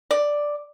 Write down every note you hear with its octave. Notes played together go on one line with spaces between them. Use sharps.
D5